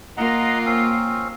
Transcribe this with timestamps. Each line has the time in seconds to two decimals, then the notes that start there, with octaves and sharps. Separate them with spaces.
0.17 A#3 F4 D#5 F#5 A#5
0.66 C4 C#4